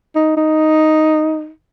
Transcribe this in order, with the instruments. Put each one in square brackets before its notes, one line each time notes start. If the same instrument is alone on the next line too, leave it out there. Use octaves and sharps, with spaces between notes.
[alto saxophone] D#4
D#4